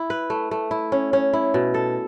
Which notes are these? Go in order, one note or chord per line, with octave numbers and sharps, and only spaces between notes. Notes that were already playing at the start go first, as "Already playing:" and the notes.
Already playing: E4
B4
A3
A3
E4
C#4
C#4
E4
B2
A4